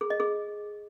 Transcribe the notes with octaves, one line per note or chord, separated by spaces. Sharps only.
G#4
D#5
G#4